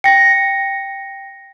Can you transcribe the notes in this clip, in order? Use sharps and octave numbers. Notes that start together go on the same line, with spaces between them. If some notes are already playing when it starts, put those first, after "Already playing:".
G5 A#6 C#7